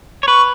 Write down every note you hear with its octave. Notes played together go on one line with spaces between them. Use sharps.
C#5
B4 C#6